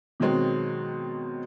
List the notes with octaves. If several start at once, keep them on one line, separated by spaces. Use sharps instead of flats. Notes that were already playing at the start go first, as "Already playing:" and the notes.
B2 D#3 F#3 G#3 C4